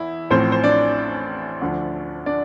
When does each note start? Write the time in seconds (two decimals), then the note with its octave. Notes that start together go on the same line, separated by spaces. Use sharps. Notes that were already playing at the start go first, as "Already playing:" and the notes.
Already playing: E2 E4
0.30 A1 A2 F3 C4 C5
0.52 C5
0.64 D4 D5
1.61 D2 D3 F3
2.26 D4 D5